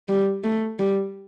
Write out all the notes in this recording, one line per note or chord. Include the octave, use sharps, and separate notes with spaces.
G3
A3
G3